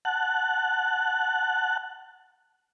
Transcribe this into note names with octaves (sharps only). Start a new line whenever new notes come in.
F#5 A5 F#6